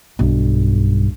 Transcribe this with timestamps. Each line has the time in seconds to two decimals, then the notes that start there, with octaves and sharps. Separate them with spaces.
0.19 B1 G2